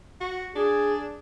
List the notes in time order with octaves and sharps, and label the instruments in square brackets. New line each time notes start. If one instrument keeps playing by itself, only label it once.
[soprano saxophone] F#4
[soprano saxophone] D4 [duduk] G#4